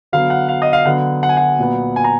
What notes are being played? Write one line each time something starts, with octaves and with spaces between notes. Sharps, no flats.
D3 F#3 B3 F5
F#5
F5
D#5
F5
D3 F#3 B3 F#5
F#5
G#5
F#5
A#2 F#3 B3
G#5
A#5